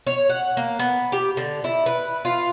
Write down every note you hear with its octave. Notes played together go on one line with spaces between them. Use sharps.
C#5
F#5
A#3
B3
G4
D3
E4
B4
F4